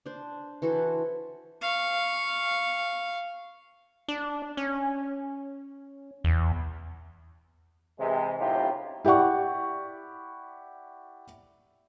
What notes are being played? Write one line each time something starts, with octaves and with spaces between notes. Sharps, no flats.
D4 C5
E3 F#4 A4 C5
F5 C#6
D4
C#4
E2
C3 E3 G#3
F#2 A2 C3 D#4 F4 G4
E4 G4 D5 F#5 C#6